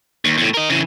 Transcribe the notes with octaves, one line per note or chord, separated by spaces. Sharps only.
D#2
E2 A2
A#4 D#5
C#3 E3